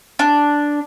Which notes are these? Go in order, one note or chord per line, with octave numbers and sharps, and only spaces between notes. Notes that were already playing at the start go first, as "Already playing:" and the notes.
D4